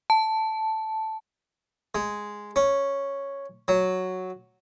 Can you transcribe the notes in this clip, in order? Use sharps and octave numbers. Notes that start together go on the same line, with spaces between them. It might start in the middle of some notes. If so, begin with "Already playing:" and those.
A5
G#3
C#4
F#3